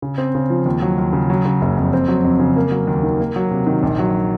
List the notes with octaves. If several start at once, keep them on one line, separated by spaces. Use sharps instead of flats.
C#3
C4
C#3
F3
D#2
F#3
D#2
C#3
F#3
C#3
F#1
F2
C4
F#3
F2
C#3
A#3
F#3
D#2
D#3
A#3
F#3
C3
D#3
A#1
F#3